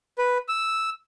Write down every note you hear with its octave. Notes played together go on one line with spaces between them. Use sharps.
B4
E6